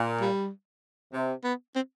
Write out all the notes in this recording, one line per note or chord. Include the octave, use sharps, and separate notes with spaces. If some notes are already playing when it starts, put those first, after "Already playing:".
Already playing: A#2
G3
C3
B3
C4